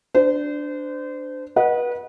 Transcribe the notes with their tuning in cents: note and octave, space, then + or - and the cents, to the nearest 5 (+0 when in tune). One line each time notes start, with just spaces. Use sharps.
D4 +0 C5 -30
B4 -30 D#5 +0 F#5 +0